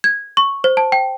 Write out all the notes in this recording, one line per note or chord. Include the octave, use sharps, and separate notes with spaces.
G#6
C#6
C5
A5
G5